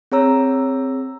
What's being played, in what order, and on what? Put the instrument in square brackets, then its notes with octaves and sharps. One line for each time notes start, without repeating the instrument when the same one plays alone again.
[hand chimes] C4 G#4 C#5 A#5 E6